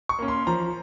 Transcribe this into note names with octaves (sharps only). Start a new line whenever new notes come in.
C#6
A#3 C#4
C6
F3 A#5